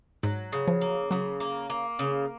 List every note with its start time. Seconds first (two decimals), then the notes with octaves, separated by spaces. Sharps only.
0.23 G#2 F#3
0.53 C#3
0.67 F3
0.81 A#3
1.11 C#3 F#3
1.40 A#3
1.70 A#3
1.99 C#3